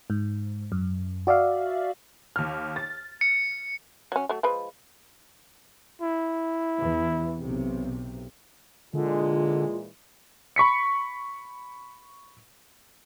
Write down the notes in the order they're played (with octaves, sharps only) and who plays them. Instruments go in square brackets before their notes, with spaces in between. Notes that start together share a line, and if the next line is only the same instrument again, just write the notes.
[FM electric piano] G#2
F#2
F#4 D5 E5 F5
[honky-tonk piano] D#2 F6
A6
[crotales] C#7
[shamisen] F#3 C#4
F#3 A3
F3 G#3 B4
[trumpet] E4
[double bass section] E2 E3
B1 C3
[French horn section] A#2 E3 G#3 [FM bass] D3 [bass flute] F4
[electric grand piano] B5 C#6 B6 C#7